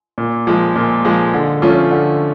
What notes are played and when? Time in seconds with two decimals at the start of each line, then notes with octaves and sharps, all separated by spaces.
0.18 A#2
0.47 F3 G#3
0.76 A#2
1.05 F3 G#3
1.34 D3
1.62 F3 A3 C#4 F4
1.91 D3